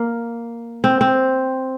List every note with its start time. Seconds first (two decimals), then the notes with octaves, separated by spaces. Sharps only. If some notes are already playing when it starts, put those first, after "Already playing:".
Already playing: A#3
0.84 C4
1.01 C4